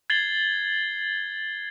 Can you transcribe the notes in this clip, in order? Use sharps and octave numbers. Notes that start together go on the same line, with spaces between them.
G#6 A6 C7 F#7 G7